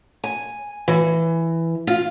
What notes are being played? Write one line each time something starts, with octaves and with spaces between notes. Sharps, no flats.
G#5
E3
F4